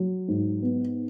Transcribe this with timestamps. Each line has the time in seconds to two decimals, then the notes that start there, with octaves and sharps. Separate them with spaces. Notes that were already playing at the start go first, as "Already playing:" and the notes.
Already playing: F#3
0.28 G#2
0.62 B3